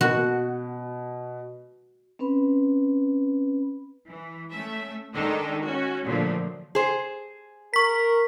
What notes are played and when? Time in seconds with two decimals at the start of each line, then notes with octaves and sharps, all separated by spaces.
0.01 B2 F#4
2.19 C4 C#4 B4 B5
4.08 E3
4.52 A3 C#4 E5
5.13 D#3 G#3 D4 D#4 A4
5.62 C#4 F#4
6.05 A#2 D3 F3 F#3 A3
6.75 G#4 C5
7.74 A#4 C#6 B6